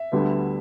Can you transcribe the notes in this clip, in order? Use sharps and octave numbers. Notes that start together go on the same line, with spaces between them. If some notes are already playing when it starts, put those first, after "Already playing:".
Already playing: E5
D2 D3 G3 B3